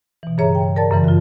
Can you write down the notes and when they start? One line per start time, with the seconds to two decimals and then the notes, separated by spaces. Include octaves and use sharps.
0.23 B2 E3
0.38 G2 C#3 G#4 C#5 E5 A#5
0.55 G5
0.76 A#4 D5 A5 A6
0.91 F#2 C#3 E3
1.04 F4 F#4